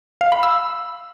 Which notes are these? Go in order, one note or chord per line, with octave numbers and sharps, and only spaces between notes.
F5
B5
E6